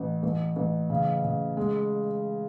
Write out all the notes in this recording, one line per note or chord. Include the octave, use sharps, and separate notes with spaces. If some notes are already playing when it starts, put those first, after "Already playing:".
Already playing: A1
A1
A1
C#3
C#3
G#3